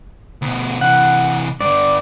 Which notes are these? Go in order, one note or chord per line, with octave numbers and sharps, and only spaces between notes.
D2 B2
C3 E3 F#5
G2 D3 D5